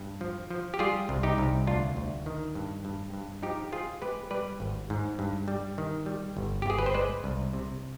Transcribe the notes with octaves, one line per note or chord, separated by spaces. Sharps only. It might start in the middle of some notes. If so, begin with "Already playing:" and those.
Already playing: G2
F3
F3
G4
G3 F4 G#4
C2
D#4 G4
C2
D2 D4 F4
D2
D#3
G2
G2
G2
F3 D#4 G4
F3 F4 G#4
G#3 G4 B4
G3 B4 D5
G#1
G#2
G2
G3
D#3
G3
G1
G4
G1 G#4
B4
C5
G#3 B4 D5
C2
C3